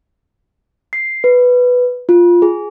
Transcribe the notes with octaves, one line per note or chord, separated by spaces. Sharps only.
C7
B4
F4
G#4